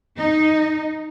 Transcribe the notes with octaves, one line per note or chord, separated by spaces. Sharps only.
D#4